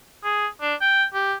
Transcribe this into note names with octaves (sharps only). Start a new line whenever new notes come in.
G#4
D4
G5
G4